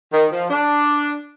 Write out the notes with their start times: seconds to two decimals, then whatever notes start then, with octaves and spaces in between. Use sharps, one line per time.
0.12 D#3
0.31 F3
0.49 D4